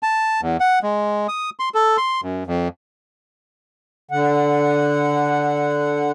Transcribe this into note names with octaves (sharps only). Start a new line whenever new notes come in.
A5
E2
F#5
G#3
D#6
C6
A4
C6
F#2
F2
D3 F#5